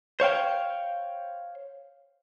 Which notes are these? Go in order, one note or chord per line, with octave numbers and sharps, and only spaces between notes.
C5 C#5 F5 G5